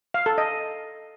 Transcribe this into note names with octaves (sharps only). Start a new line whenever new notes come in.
F5
A4
D#5